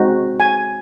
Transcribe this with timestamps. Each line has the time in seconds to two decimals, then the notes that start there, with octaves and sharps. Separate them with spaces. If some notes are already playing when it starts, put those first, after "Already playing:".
Already playing: G#3 C4 D#4 F#4
0.40 G#5